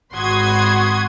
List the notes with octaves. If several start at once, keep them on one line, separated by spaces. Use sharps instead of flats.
G#1 F#4 B5 C6 D#6 G#6